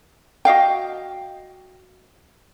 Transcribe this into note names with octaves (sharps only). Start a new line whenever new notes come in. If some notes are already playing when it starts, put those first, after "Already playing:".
F#4 D#5 F5 G5